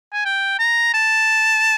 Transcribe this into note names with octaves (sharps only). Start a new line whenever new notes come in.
G#5
G5
A#5
A5